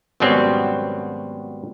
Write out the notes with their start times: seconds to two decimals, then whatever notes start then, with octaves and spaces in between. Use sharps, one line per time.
0.20 G#1 B2 F#3 G3 C4 C#4